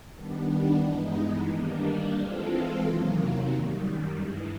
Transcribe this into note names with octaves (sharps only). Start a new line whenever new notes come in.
D#3 G3 B3 D4
G2 E3 G#3 B3 D#4
D#3 G3 A#3 D4
E3 G#3 C4 F4 A4
E2 C3 D#3 F#3 A#3
F#2 D#3 G3
G2 E3 G#3